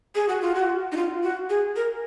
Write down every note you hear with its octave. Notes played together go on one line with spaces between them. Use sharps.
G#4
F#4
F4
F#4
D#4
F4
F#4
G#4
A#4